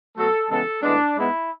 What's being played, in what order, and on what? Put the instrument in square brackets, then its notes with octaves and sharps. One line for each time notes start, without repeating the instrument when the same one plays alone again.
[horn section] B2 F#3 A3 A4
C#3 E3 G#3 B3 A4
A2 E3 G#3 B3 D4
G#2 G#3 B3 E4